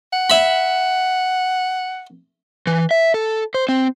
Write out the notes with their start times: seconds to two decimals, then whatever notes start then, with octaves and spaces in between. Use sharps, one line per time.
0.13 F#5
0.30 E5 B5
2.67 E3
2.91 E5
3.14 A4
3.54 C5
3.69 C4